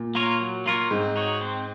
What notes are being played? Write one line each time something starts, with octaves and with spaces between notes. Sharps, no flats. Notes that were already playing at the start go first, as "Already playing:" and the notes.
Already playing: A#2
A#3 F4 A#4 C#5
F#3
A#3 F4 A#4 C#5
G#2 C4
D#4 F#4 C#5
C4